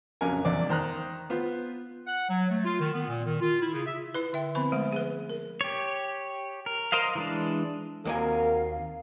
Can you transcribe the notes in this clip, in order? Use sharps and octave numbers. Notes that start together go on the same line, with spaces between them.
A#1 F2 C#3 F#3 A#4 G#5
G#1 E2 D5
D#3 C5 A#5 F#6
B3 F4 C5
F#5
F#3
A3
F4
D#3
B3
A#2
D#3
F4
E4
C#3
E5
E4 B4
D3 E5 G5
D3 F3 B3 C4 B5 C#6
F3 G#3 A3
G#4 B4
A#4
G4 C#5
A#4
A#4 C5 D#5 F5
E3 G#3 D4
D#2 A#3 C4 F#4 A#4 F5 G#5